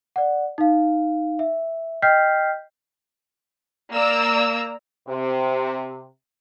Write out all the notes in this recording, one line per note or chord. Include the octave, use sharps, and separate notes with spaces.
D5 F#5
D#4 F5
E5
D#5 G5 F6 G6 B6 C7
A#3 D5 A#5 E6
C3